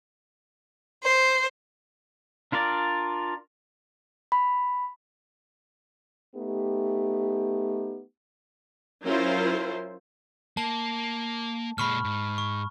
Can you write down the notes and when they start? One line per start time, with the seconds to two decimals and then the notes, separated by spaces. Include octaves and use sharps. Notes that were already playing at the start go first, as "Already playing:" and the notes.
1.02 C5
2.52 D4 F4 A#4 D5
4.32 B5
6.36 A3 B3 D#4 G4
9.04 F#3 C#4 E4 F4 A#4 C5
10.57 A#3 A5
11.78 A#2 G#3 B5 C#6 F6
12.05 G#2
12.38 C#6